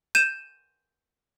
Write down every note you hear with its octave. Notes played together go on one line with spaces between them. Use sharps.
G6 D#7 E7